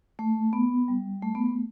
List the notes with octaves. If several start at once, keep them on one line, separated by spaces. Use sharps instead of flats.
A3
B3
G3
A3
B3
A3